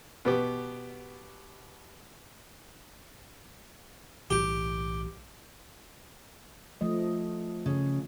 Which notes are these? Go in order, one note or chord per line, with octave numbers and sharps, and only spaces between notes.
B2 B3 G4
B1 A2 E3 G4
F3 A3 D#5
C#3